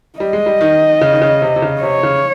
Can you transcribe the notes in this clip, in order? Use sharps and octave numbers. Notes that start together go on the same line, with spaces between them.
G3 D#5
G#3
G3
D#3
C#3
D#3
C#3
C3
C3
C#3
C3 C#5
C#3